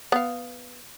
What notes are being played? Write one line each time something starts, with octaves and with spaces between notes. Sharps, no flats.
B3 F5